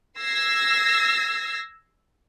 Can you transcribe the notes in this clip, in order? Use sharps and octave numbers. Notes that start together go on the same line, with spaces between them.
E6 G#6 A#6 C7